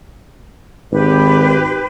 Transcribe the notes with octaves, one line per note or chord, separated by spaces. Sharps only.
G#1 G4 B4